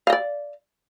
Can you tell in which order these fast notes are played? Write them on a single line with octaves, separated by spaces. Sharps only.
F5 D#5 D5